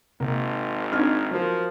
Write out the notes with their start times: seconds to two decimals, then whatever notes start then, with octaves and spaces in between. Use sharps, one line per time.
0.20 G#1 C3 A#3
0.93 C4 D4 D#4 F6 G#6
1.31 F3 F#3 A#4